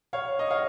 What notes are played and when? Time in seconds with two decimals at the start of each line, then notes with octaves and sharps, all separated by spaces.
0.13 C#5 F5
0.39 D#5
0.50 C#5 F5